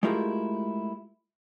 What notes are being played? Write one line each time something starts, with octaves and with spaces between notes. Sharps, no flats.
G#3 A3 E4 F4 G4 A#4